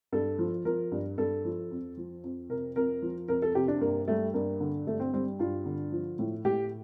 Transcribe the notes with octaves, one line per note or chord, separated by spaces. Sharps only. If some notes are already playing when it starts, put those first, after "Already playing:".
G2 A4
F3
F3 A#4
G2
G2 A4
F3
F2
F3
F2
C3 A#4
F2 A#4
F3
F2 A#4
A4
C3 G4
D4
G2 A#3
G3 A3
G2 A#3
D3
G2 A3
C4
G3 C4
G2 F4
D3
F3
A2
A2 G4